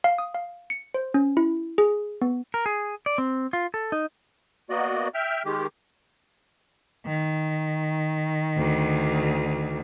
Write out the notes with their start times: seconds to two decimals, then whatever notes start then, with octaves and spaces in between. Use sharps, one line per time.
0.04 F5
0.18 D#6
0.35 F5
0.70 C#7
0.94 C5
1.14 C#4
1.37 E4
1.78 G#4
2.22 B3
2.54 A#4
2.66 G#4
3.06 D5
3.18 C4
3.53 F4
3.74 A4
3.92 D#4
4.70 A#3 B3 F#4 D5 D#5
5.14 E5 G5 F6
5.45 D#3 G#3 G4
7.06 D#3
8.57 D2